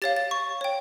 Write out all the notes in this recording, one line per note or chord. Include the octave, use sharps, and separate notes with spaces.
G4 C#5 F5 A6
A6
C#6
C#5 G5